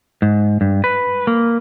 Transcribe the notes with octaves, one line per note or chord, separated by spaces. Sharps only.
G#2
G2
B4
A#3